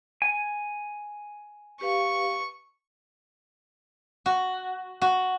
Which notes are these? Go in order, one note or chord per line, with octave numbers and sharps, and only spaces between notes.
G#5
G4 B4 F5 C#6
F#4
F#4